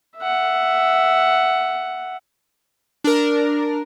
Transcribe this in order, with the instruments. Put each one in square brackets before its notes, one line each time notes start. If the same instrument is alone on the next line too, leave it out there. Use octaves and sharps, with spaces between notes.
[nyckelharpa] E5 F#5
[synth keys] D4 A#4